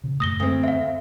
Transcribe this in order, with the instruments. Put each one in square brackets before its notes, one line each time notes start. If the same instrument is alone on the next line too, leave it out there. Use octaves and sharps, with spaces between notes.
[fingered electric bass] A#2 C#3
[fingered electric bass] F#2 A3 [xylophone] D#6 A#6 G7
[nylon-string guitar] D2 C4
[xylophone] E5 F5